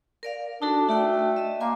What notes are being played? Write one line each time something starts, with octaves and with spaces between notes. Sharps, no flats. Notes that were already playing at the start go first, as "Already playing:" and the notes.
A#4 D5 F5
D4 D#4 F#4 A4
A3 F#4 D5 G5
D#5 E5
A#3 G#5 C6 D6